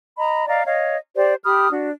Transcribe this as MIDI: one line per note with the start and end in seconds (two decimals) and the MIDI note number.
0.18 0.47 75
0.18 0.47 82
0.18 0.47 83
0.48 0.63 74
0.48 0.63 75
0.48 0.63 77
0.48 0.63 82
0.65 0.96 73
0.65 0.96 75
0.65 0.96 77
1.15 1.35 67
1.15 1.35 72
1.15 1.35 74
1.44 1.69 67
1.44 1.69 83
1.44 1.69 87
1.44 1.69 89
1.70 1.89 62
1.70 1.89 66